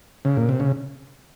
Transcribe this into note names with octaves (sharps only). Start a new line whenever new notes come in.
C#3
A#2
C3
C#3